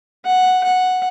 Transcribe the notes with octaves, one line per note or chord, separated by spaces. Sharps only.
F#5
F#5